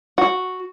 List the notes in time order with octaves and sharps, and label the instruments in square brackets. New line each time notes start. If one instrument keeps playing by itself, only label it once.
[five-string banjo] F#4